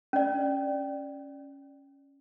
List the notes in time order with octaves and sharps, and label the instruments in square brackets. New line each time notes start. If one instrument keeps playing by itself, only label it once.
[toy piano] C#4 D5